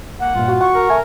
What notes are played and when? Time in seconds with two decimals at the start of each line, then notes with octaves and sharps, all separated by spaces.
0.20 A#3 F#5
0.35 G2 A#2 F4
0.48 F#4
0.61 F#5 C#6
0.75 A#4
0.90 A3 G#5